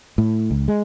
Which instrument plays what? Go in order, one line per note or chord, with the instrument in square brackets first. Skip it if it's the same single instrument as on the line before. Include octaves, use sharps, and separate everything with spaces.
[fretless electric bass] A2
C#2
G#3